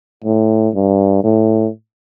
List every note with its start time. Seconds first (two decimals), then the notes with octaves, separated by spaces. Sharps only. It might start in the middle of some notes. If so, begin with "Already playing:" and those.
0.24 A2
0.74 G2
1.24 A2